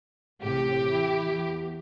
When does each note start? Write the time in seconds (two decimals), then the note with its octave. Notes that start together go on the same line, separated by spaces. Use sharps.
0.41 A1 A2 C3 G4
0.89 E3 E4
1.27 E2